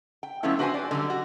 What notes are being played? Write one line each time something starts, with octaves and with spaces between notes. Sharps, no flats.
G5
F3 G#3 A3 B3 C#4 E4
D4 F#4 B4 C5 F5 G#5
D5
D3 F#3 G3
F#4